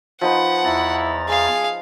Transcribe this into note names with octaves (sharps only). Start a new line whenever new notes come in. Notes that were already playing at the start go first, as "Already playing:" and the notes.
F3 D#4 B4 F#5
E2 E4 A#5 A6
G#4 F5